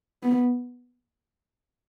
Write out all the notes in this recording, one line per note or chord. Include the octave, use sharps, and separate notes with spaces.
B3